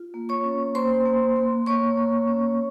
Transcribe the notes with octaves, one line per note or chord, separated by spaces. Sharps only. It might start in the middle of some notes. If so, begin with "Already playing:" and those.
Already playing: F4
A#3
C#5 C#6
C#4
A#3 C5 C6
A#3
A#3
A#3 C#5 C#6
A#3
C#4